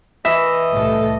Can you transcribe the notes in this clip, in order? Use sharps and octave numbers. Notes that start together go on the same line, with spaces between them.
E3 D#5 E5
C2 A2 A4